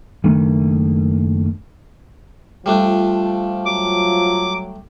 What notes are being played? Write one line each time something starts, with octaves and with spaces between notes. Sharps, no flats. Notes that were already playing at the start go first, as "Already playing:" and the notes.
F#1 D#3 A3 D4
F3 G3 A3 D4 F4
F#3 D6